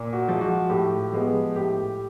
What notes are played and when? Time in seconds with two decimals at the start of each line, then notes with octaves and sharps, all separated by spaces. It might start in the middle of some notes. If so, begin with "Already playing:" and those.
Already playing: A#2
0.13 F#4
0.28 F3 G#3
0.41 F#4
0.70 A2 G4
1.12 F3 G#3 B3
1.55 A2 G4